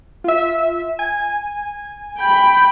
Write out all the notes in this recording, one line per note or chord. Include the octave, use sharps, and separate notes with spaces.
F4 E5
G#5
G5 B5